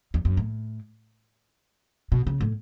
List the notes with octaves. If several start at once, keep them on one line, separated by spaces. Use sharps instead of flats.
E2
F#2
A2
B2
C#3
A2